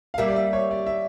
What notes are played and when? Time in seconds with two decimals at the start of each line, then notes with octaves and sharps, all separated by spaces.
0.14 F5
0.18 G3 A#3 E5
0.28 D5
0.36 E5
0.53 C#5
0.71 D5
0.86 E5